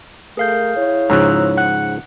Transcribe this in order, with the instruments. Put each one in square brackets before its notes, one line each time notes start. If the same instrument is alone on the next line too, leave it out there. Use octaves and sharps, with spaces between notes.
[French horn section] A3 A#4 [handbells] G#4 F5 G6
[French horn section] E4 C#5
[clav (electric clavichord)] G#2 C#3 F3 [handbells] A#5 E6 F#6
[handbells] F#5 F#6